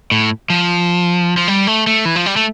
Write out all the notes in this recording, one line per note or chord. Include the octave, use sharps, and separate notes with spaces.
A2
F3
F3
G3
A3
A3
E3
F3
G3
A3